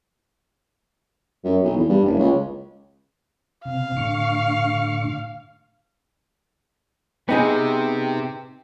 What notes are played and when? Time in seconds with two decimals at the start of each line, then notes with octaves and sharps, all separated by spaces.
1.45 F#2
1.64 B1
1.76 E2
1.89 G2
2.05 F#1
2.19 C#2
3.65 C3 F5
3.97 A2 D3 C#6
7.29 C3 B3 D#4 G#4 G5